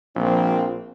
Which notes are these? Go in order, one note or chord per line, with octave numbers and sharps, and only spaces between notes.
A#1 F3 A#3 C4